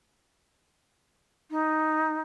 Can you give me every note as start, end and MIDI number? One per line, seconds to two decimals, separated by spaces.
1.51 2.21 63